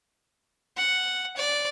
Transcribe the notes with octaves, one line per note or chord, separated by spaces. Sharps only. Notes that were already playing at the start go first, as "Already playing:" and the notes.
F#5
D5